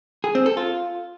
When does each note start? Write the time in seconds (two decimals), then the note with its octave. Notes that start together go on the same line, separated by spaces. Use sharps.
0.24 G#4
0.35 C4
0.46 A4
0.57 F4